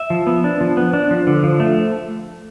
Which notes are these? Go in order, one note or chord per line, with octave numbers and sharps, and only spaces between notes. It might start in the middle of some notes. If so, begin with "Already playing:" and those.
Already playing: E5
F3
B3
D4
F3
B3
D4
F3
D3
F3
A3